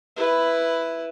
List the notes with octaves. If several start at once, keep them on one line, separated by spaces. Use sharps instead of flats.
E4 B4